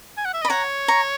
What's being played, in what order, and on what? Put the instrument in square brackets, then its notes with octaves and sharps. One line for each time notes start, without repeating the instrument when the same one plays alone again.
[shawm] G#5
F#5
E5
[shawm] D#5 [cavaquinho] B5
[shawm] C#5 [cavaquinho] F#5 A#5
[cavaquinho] A#5 C#6